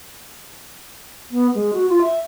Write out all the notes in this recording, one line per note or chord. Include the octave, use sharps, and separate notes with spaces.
B3
G#3
F#4
F4
E5